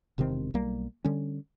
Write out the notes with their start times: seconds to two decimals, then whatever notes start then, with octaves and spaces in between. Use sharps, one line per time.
0.18 E1 C3 D#3 C4
0.54 B1 G3 A#3
1.04 D3 G3 C#4